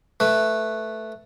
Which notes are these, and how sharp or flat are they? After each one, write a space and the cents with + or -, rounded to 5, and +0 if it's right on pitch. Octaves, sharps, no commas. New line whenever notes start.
A3 +0 B4 +0